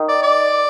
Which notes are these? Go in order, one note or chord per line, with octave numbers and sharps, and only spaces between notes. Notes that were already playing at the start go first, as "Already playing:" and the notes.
Already playing: D#3
D5
D5